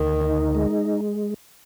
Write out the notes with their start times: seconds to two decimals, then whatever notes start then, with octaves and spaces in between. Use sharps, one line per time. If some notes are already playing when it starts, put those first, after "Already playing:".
Already playing: D2 D#3
0.21 D#4
0.55 G#3